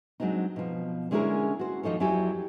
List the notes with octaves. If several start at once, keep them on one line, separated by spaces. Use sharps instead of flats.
F#3 G#3 C4 D4 D#4
B2 F3
D3 G#3 C#4 E4 G#4 A#4
F#4 C5
D#2 F3 D#4 A4 C#5
F2 F#3 E4 G4 D5 G#5